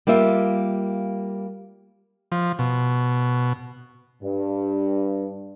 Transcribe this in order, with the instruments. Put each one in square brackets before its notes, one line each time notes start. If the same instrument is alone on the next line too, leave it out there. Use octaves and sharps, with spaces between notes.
[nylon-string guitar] G3 A#3 F4 E5
[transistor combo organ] F3
B2
[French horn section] G2